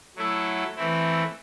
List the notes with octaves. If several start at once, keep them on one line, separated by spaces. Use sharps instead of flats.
F#3 A3 E4 A4
E3 A3 C4 E4